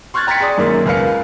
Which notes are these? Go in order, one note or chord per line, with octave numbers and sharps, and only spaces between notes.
C6 C#6 F6 F#6 G#6 A6
G5 A#5 C6 A6 B6 C#7
G#4 D5 D#6
F#2 D#3 A#3 G#4 A6
C#2 A#4 B4 F5 C#7